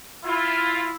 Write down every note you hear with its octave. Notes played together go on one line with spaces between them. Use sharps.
E4 F4